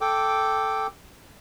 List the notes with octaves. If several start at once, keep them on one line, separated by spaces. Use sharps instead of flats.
A4 G5 D6